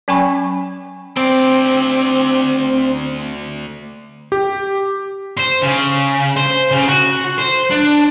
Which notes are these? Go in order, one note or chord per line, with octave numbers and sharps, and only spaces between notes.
F#3 C#4 G5 G#5 B5 C#6
D2 C4 D5
G4
C5
C#3
C5
C#3
F#4
C5
D4